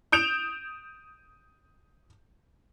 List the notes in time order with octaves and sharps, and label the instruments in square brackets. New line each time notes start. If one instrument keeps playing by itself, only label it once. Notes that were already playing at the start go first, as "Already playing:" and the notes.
[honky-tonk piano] D#6 G6 D7 E7 F7